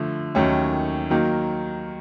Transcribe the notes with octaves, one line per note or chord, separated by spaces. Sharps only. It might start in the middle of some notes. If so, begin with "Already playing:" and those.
Already playing: D3 F3 A3
D#2 D#3 F#3 A3 C#4
D#3 F#3 A#3